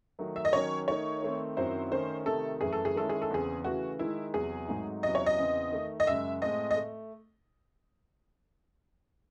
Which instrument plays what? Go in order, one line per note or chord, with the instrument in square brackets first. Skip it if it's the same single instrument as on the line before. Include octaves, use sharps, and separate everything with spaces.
[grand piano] D#3 F#3 A3
[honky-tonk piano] E5
D#5
[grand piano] D#3 F#3 C#4 [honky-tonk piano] C#5
[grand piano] D#3 A3 D#4 [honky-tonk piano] C#5
[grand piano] D#3 A3 C4
[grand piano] F#2 D#3 F#3 C4 E4 [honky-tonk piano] C5
[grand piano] D#3 A3 C#4 [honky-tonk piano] C5
[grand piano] C3 D#3 A3 [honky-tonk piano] A4
[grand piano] F#2 E3 A3 [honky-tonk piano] G#4
[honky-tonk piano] A4
G#4
[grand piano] D#3 G#3 C#4 E4 [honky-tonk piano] A4
[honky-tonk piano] G#4
A4
[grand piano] E2 C#3 E3 C4 [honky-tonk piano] G#4
[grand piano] C#3 E3 A3 [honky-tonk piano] F#4
[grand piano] D#3 G#3 D#4 [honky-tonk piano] E4
[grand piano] E2 C3 F#3 [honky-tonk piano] G#4
[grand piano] G#2 F#3 A3 C4 D#4
[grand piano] E2 C3 F#3 C#4 E4 [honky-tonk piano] D#5
[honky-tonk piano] C#5
D#5
[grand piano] E2 C#3 E3 C4
D#3 A3 D#4
[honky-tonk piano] D#5
[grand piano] F#2 C#3 G#3 [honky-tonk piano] E5
[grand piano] A2 G#3 C4 [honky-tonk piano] D#5
[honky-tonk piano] D#5
[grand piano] A3